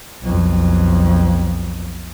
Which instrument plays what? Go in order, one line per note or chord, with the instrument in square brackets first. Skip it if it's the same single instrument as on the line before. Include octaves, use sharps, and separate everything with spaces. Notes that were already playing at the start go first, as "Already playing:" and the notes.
[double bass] B1 F2